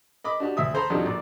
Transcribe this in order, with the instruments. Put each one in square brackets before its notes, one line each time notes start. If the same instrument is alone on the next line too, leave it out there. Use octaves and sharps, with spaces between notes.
[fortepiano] D#5 B5 D6
D4 F#4 G4
D2 E5 D#6
A4 C5 A#5 B5
F2 F#3 G3 D4 D#4
A#1 D5